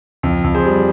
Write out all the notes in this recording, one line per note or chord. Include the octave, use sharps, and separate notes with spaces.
F2
F2
G#4 C5
G3